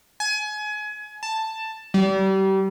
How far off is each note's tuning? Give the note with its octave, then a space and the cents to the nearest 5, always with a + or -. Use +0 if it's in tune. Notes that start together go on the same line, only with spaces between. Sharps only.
G#5 +30
A5 +10
G3 -30